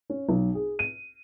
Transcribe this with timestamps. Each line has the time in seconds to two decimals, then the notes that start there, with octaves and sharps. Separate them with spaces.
0.10 C#4
0.29 B1
0.54 G#4
0.79 D#7